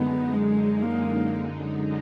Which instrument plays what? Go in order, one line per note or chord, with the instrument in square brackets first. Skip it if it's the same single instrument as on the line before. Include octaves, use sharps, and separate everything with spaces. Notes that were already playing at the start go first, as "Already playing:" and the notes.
Already playing: [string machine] F#2 D3 G#3 D#4 [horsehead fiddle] B3
[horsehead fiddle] G#3
A#3